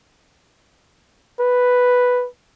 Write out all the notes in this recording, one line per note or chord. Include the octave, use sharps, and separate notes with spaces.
B4